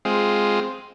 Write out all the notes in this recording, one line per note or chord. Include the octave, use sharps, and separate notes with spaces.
G#3 C4 F4